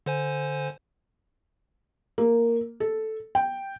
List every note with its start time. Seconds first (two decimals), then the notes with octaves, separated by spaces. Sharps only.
0.06 D3 C5 G#5
2.18 A#3
2.80 A4
3.35 G5